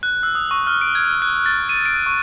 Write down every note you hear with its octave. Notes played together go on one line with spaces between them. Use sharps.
F#6
E6
D#6
C#6
F6
D7
G#6
F#6
A6
D#7
D7
C#6